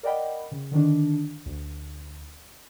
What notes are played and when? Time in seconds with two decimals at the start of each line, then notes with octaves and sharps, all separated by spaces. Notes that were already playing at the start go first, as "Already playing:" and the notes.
0.03 A#4 D5 D#5 F#5 G5 B5
0.52 C#3
0.71 D3 D#3 D4
1.46 D2